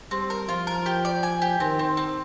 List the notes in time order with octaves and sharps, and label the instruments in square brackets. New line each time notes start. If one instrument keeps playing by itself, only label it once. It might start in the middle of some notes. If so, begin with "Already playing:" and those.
[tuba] G3 [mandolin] C4
[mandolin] A#4
[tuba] F3 [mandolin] F4
[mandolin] A#4
G4
D5
G#5
G4
[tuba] D#3 [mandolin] C4
[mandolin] C4
C4